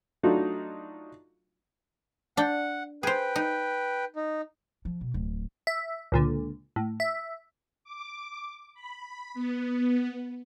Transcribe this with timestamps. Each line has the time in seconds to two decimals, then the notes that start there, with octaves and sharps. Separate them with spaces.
0.23 F#3 A3 D4 D#4 F4 F#4
2.37 D4 F#5 G5
3.03 G#4 B4 C5 G5
3.36 D#4
4.16 D#4
4.85 F3
5.01 B2
5.14 D1
5.67 E5
6.12 C#2 A#2 D3
6.76 A2
7.00 E5
7.84 D6
8.74 B5
9.34 B3